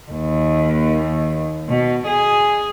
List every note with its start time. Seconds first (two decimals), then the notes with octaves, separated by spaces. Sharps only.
0.11 D#2
1.69 B2
2.07 G#4